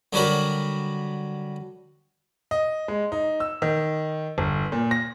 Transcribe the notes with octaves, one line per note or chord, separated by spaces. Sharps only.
D3 F#3 G3 F#4 A#4
D#5
G#3
D#4
E6
D#3
G1
A#2
A#6